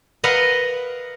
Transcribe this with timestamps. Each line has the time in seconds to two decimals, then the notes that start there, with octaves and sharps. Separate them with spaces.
0.24 A#4 B4 D#5 F5 F#5